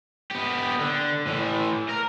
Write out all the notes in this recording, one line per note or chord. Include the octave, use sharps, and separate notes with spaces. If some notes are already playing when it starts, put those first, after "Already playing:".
B3 G4
D3
A2 E3
A#4